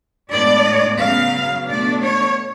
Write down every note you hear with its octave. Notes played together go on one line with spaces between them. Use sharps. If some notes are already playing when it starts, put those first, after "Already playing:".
A2 G#3 B3 D4 D5
C#3 F#3 B3 F5
B2 A3 D4 D5
C#5